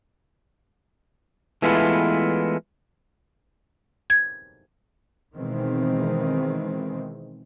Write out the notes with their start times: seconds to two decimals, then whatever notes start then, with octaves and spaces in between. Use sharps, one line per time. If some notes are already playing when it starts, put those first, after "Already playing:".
1.62 E3 G#3 A3 B3 E4 F4
4.10 G#6
5.35 B2 D#3 E3 G#3 C4